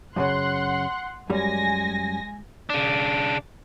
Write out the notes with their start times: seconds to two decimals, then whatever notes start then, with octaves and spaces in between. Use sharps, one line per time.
0.16 F#2 A#2 C#3 F#5 C6 F#6
1.30 F#2 G3 G#3 G#5 A#6
2.70 C#3 D4